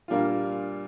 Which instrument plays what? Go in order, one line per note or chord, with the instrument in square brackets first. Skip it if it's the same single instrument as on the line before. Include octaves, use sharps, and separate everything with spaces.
[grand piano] A#2 G3 A#3 D4 F4